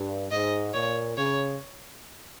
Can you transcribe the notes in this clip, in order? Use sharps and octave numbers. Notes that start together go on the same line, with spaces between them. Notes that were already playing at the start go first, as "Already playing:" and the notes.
Already playing: G2
G#2 D#5
A#2 C#5
C#3 C#5